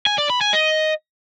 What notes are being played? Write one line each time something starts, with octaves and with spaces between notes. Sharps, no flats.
G#5
D5
B5
G#5
D#5